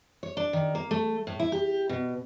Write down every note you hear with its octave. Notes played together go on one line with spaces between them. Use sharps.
C#5
D4
D#3
A#3
A3
A2
E4
G4
B2